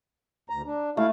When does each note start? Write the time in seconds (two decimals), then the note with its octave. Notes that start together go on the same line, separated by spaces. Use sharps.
0.50 D2 A#5
0.66 D4
0.97 A3 E4 F5